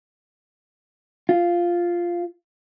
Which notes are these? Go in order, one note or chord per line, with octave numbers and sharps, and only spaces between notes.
F4